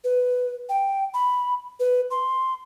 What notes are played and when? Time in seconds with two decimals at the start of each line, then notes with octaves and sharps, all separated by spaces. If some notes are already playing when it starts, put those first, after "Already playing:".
0.04 B4
0.69 G5
1.14 B5
1.80 B4
2.11 C6